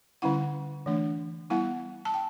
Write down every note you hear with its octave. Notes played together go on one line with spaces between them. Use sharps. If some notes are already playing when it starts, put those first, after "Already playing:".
D3 G3 C#4 E4 F#5
E3 A3 D4
G3 B3 E4 F#5
A5
G5